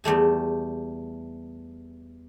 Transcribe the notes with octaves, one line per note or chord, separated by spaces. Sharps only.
E2 G3 A3 G#5